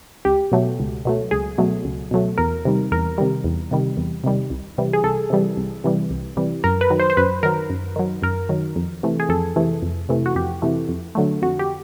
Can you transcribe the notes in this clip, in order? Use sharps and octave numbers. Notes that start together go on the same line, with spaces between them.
C#2 G4
B2 F#3 A3
C#2
B2 F#3 A3
C#2 G#4
B2 F#3 A3
C#2
B2 F#3 A3
E2 A#4
C3 D#3 G3
E2 A#4
C3 D#3 G3
E2
C3 D#3 G3
E2
C3 D#3 G3
C2
C3 E3 G3
G#4
C2 A4
C3 E3 G3
C2
C3 E3 G3
C2
C3 E3 G3
F#2 A#4
B4
D#3 F#3
C5
C5
F#2 B4
D#3 F#3 A#4
F#2
D#3 F#3
F#2 A#4
D#3 F#3
F2
C3 E3 A3
G#4
F2 A4
C3 E3 A3
F2
C3 E3 A3
F#4
F2 G4
C3 E3 A3
F2
D3 F#3 A3
F2 F#4
G4